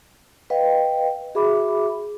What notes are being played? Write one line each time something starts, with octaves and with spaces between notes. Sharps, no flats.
B4 D#5 F5 G5
F#4 G#4 E5 B5 D6